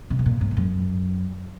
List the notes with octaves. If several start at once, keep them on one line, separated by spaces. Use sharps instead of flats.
C#3
C3
A#2
G#2
G#2
F#2